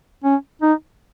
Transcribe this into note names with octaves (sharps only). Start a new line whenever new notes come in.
C#4
D#4